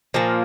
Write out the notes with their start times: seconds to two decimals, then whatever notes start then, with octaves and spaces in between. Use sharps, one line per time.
0.14 A#2 F3 A#3